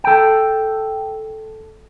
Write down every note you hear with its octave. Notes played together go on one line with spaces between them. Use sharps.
A4 G5